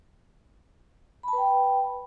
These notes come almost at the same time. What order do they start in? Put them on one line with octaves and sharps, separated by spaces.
B5 A5 B4 G5